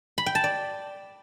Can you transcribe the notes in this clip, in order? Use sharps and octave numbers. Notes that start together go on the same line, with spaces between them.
B5
G5
A5
D5